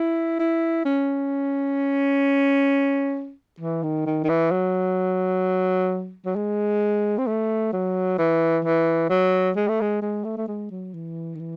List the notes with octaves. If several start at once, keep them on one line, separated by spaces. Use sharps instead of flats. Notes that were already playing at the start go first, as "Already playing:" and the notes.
Already playing: E4
E4
C#4
E3
D#3
D#3
D#3
E3
F#3
F#3
G#3
C4
A3
F#3
E3
E3
F#3
G#3
A3
G#3
G#3
A3
A3
G#3
F#3
E3
D#3
E3